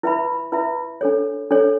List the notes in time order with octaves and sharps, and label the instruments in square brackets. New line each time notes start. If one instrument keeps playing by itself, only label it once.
[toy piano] E4 B4 E5 B5
E4 B4 E5 B5
D4 A4 C#5
D4 A4 C#5